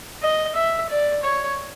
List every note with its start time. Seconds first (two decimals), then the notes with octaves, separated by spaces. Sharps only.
0.23 D#5
0.56 E5
0.90 D5
1.23 C#5